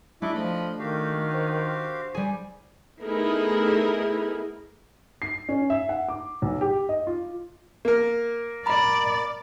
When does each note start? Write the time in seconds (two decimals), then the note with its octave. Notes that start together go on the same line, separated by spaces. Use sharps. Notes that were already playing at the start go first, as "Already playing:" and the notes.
0.22 F#3 G#3 D4 E4 D#5 C#6 D6
0.35 F3 A3 D#5 B5
0.79 D#3 F#4 G4 F5
1.34 C5
2.15 G3 G#4
3.03 A3 B3 D#4 E4 G#4 A#4
5.22 C7
5.49 C#4
5.70 E5
5.89 F#5
6.09 D6
6.42 B1
6.61 G4
6.89 D#5
7.07 F4
7.85 A#3 A#4
8.66 D5 A#5 B5